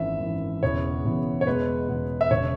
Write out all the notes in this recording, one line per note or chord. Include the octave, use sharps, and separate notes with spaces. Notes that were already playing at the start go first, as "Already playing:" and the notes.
Already playing: G#1 F#2 E3 E5
G#1 F#2 E3
E1 E2 C#3 E3 B3 C#5
E1 E2 C#3 E3 B3
C#5
E2 B2 G#3 B3 B4
E2 B2 G#3 B3
E5
E1 C#3 C#5